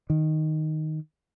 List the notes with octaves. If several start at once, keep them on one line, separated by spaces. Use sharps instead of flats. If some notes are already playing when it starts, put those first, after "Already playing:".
D#3